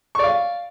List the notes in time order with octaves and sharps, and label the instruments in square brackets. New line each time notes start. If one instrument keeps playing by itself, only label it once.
[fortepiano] C#6
D5
F5